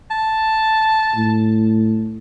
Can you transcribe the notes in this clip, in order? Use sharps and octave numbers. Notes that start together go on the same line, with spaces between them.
A5
A2